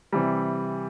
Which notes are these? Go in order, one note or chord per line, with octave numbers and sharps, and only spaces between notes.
C3 E3 G3